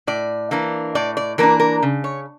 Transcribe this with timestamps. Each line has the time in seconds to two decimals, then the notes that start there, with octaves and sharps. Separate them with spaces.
0.07 A2 D5
0.51 E3 A#3 D4
0.95 A2 D5
1.17 D5
1.38 E3 A#3 D4 A#4
1.60 A#4
1.83 C#3
2.04 C#5